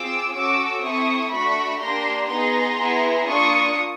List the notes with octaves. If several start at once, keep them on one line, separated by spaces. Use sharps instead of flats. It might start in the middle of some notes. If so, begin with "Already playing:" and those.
Already playing: C4 F4 G#4 D6 E6
C#4 F#4 A4 D6 E6
C4 E4 A4 C#6 D#6
A3 D4 F#4 B5 C#6
A#3 D4 G4 A#5 C6
B3 D#4 G#4 A#5 C6
B3 E4 G#4
A#3 D4 F4 C#6 D#6